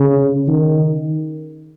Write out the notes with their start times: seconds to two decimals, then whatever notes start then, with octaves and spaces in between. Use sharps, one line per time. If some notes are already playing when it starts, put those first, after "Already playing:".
Already playing: C#3
0.48 D#3